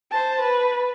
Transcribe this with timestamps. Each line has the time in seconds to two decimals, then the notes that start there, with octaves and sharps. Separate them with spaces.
0.11 C5 A5
0.41 B4